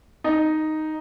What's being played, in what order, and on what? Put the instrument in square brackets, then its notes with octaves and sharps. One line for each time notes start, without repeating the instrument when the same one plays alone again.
[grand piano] D#4